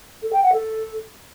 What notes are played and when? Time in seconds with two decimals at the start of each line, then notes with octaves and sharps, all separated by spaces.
0.23 A4
0.33 G5
0.43 F#5
0.53 A4